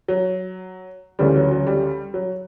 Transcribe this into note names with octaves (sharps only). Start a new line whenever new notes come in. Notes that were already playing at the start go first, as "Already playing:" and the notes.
F#3
D2 C#3 E3 G3
F#3
F#3
G3
F#3